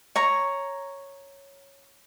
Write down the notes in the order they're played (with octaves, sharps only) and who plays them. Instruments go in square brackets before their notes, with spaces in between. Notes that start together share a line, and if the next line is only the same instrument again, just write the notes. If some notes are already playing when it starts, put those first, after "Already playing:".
[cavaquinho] C#5 A#5 C#6